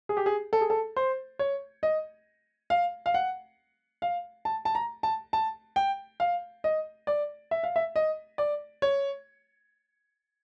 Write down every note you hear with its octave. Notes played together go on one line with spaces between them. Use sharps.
G#4
G4
G#4
A4
G#4
A4
C5
C#5
D#5
F5
F5
F#5
F5
A5
A5
A#5
A5
A5
G5
F5
D#5
D5
E5
F5
E5
D#5
D5
C#5